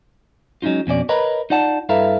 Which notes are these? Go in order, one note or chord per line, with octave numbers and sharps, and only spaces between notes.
F#3 G#3 C#4 D#4 F4
F2 B2 C#4 D5
A#4 B4 C#5 D#5 A#5 B5
D#4 F4 D5 F#5 A5
G2 E4 A4 B4 F5 A#5